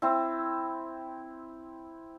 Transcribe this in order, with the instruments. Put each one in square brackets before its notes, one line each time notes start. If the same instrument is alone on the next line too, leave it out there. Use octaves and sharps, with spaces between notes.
[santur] C4 E4